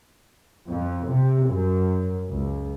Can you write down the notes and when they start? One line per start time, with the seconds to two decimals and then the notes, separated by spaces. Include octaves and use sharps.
0.67 F2
1.08 C3
1.46 F#2
2.29 C#2